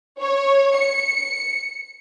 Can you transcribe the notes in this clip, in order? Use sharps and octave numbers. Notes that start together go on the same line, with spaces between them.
C#5
C#7